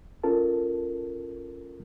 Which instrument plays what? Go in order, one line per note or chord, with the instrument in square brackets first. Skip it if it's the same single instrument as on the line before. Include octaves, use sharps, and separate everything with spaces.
[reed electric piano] C#4 F4 A4 A#4 A5